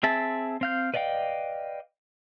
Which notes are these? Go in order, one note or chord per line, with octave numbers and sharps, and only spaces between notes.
C4 G#4 E5 A5
C4 F5 G6
B4 D5 D#5 F5 G5